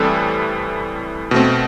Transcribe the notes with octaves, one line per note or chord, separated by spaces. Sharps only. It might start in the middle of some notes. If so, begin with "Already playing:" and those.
Already playing: A2 E3 G3 C4 A4 B4
B2 A3 C4